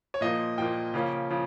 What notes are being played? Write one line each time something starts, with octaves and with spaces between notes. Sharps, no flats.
C#5
A#2 F3 A#3 D#5
A#2 F3 A#3 G5
C#3 F3 A#3 C#4
C#3 F3